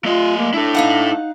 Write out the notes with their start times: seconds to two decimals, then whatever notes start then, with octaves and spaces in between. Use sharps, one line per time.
0.05 A3 F4 D#5
0.37 A#3
0.54 D4 E4 A4
0.75 D#4 F5 F#5